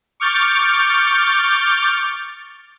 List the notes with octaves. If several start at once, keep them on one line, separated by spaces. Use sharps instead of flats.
C#6 D6 F6 G6 A6